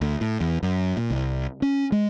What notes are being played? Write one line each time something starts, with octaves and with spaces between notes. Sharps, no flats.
D2
A2
E2
F#2
A#2
C2
C#4
G#3